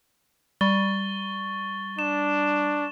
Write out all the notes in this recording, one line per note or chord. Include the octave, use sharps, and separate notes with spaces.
G3 C#6 A6 G7
D4 E7